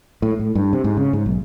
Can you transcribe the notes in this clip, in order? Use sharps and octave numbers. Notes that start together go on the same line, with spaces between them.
A2
A2
G2
C3
G#2
C#3
G#2
B1